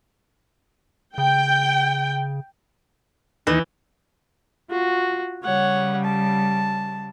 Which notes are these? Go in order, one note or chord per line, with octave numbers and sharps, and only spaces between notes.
C#3 G5
D#2 E3 D#4
F4 F#4
C#3 G3 C#5 F#5
A5